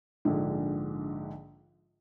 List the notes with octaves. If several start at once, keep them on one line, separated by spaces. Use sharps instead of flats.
A#1 G#2 D3